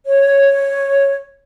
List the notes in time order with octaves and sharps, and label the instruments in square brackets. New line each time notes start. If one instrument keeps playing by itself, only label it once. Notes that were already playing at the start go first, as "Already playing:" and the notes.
[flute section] C#5